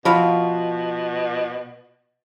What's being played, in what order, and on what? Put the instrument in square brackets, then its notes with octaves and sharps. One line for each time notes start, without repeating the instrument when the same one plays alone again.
[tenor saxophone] B2 [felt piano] F3 [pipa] E4 F#4 F5